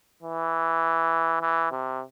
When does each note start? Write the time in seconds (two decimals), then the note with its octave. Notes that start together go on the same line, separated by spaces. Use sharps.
0.23 E3
1.41 E3
1.72 C3